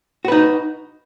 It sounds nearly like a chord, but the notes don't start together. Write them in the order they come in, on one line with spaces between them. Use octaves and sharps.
F#4 B4 D#4